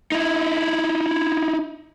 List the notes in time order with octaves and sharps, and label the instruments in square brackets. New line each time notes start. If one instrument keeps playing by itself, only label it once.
[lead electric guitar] D#4 E4